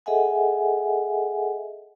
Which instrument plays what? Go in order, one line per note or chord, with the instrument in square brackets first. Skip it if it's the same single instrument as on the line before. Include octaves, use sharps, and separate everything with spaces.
[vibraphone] G#4 A4 D#5 E5 F#5 G#5